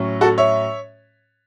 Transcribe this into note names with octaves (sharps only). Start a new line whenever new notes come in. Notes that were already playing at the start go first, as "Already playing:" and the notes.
Already playing: A2 F#3 C#4
F#4 A4
C#5 E5